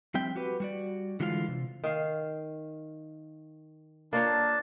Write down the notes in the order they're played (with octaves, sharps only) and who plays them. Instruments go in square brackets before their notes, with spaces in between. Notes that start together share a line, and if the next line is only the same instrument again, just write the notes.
[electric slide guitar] F3 G3 C4 E5 G5
F#4 G4 B4
G3 F#4 D5
D3 E3 G#3 F4 A4 F5
C3
[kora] D#3 F5
[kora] A#3 F4 C#5 [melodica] D4 A5